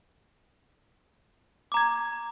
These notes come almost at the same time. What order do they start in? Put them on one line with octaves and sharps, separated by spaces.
D6 A#5 G#6